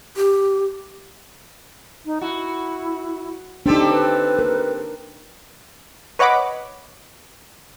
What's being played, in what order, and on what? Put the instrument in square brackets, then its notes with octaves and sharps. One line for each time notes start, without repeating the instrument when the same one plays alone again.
[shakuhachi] G4
[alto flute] D#4
[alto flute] E4 [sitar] F#4
[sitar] C4 G4 A4 [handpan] D4 D#4
[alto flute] B4
[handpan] A#4
[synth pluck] B4 C#5 D#5 F#5 B5 D6